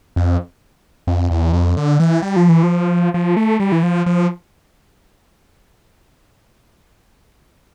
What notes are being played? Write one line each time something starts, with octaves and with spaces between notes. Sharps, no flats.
F2
F2
E2
F2
D3
E3
G3
F3
E3
F3
F3
A3
G3
E3
F3
F3